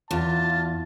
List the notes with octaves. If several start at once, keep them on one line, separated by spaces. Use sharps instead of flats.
E2 F4 A5